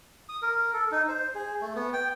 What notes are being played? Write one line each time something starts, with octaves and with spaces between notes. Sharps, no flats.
D#6
A#4
A4
D#4
C5
G#4
A3
B3
G5